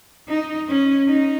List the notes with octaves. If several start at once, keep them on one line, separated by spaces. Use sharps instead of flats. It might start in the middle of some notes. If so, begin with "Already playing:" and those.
D#4
C#4
D#4